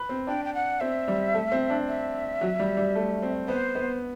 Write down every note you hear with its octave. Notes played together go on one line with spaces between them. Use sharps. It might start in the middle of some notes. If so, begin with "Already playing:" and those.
Already playing: B4
C4
D4 G5
G5
F#5
C4 E5
G3
A3
C4
D4
E5
F#3
G3
G3
A3
C4
B3 C5
B3